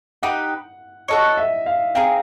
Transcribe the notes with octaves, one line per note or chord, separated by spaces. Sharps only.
D#4 G4 B4 F#5
F#4 A4 C#5 D#5
E5
F5
C4 D#4 G#4 F5